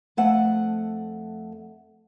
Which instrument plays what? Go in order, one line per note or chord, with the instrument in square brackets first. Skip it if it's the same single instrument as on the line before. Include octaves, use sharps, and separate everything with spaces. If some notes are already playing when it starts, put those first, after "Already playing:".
[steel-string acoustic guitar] F2 A3 F#5